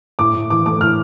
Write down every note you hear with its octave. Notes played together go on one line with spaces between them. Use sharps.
A2 D6
A2
E3 D6
A3 D6
A2 F6